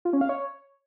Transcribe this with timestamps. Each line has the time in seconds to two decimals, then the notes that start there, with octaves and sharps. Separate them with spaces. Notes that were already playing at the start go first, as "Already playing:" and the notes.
0.05 F4
0.13 C#4
0.21 F5
0.29 C#5